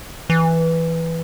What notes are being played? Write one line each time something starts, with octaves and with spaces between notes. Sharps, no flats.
E3